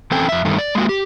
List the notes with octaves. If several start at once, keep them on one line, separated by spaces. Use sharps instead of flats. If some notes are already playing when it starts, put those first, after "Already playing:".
E3 C4 C#4 A4 G5 G#5
F2 E5
G2 D#3 A3
D5
G#3 A#3 F4 F#4
G4